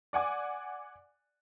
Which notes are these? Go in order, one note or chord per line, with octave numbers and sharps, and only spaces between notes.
D5 F#5 G#5 D6